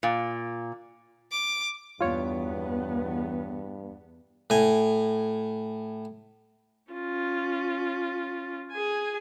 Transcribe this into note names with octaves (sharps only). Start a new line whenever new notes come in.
A#2
D6
E2 G2 B3 F4 C#5
A2 G#5
C#4 F4
G#4 G#5